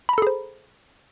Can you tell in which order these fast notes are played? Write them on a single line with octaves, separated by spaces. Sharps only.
B5 A#5 A4 G#4 C5